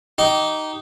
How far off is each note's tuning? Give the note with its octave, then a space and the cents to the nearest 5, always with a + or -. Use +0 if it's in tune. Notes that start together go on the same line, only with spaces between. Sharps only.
D#4 +0 G4 -20